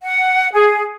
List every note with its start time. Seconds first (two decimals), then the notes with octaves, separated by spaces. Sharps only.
0.03 F#5
0.53 G#4